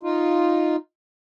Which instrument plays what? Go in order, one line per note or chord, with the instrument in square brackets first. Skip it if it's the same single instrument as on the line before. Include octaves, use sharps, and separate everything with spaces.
[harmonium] D#4 F4